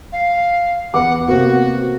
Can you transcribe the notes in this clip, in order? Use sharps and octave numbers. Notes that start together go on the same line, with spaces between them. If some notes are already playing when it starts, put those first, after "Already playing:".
F5
E2 B4 F#5 D6
C3 A#3 B3 F#4